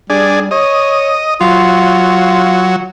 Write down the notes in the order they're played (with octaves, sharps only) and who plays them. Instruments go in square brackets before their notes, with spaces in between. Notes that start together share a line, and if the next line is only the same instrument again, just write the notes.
[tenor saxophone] G3 [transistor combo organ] D4 G#4
[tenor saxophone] C#5 [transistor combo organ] D#5
[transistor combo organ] F#3 [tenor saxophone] F4